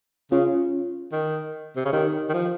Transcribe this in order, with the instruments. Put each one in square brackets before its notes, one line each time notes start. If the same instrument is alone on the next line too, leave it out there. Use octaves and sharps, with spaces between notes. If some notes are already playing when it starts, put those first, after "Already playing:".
[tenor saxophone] C#3 [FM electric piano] C#4 F4
[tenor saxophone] D#3
C3
C#3
[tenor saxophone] D#3 [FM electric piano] D#4 G4
[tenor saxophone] D#3
F3